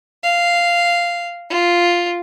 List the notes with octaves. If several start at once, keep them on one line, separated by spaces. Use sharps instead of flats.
F5
F4